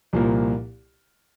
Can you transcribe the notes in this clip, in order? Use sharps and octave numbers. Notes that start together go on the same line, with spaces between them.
C2 A#2 F3 A#3